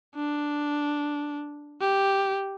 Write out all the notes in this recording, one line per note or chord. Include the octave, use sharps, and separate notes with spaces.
D4
G4